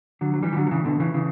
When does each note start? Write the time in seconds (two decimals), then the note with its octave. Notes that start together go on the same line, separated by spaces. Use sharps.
0.21 D3 F#3
0.34 F#3
0.43 E3 G3
0.53 E3
0.56 D3 F#3
0.66 F#3
0.71 C#3 E3
0.85 B2 D3
1.00 C#3 E3
1.14 C#3 E3